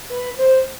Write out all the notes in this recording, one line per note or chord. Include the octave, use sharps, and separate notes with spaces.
B4
C5